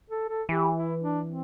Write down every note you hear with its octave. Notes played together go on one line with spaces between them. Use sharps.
A4
A4
E3 G4
E4
D4
C4